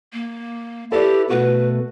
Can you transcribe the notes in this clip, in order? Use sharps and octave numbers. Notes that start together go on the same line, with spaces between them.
A#3
E4 G4 A4 B4 D5
B2 A3 F#4 B4